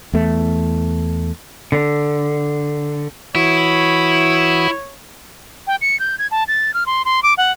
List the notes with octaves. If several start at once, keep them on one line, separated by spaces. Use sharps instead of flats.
E2 A3
D3
E3 E4 F#4 C#5 D#6
G5
C#7
G6
G#6
A5
A6
F6
C6
C6
D6
F#5